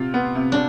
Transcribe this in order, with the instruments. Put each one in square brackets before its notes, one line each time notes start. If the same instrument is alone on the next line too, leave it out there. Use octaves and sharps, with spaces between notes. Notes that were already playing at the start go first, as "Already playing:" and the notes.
Already playing: [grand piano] C3 F4
B3
C3
[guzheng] D4